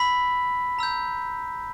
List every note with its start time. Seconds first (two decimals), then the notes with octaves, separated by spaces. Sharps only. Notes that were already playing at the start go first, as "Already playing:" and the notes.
Already playing: B5 E6 B6
0.79 A#5 E6 G6